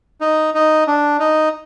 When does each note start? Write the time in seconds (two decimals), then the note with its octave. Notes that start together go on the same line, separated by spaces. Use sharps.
0.21 D#4
0.54 D#4
0.87 D4
1.19 D#4